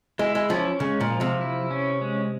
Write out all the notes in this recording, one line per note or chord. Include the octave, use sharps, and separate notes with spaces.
G#3 E4
G#3
F3 C#4
C#3 G#3
A#2
F3
C3
E4
C#4
G#3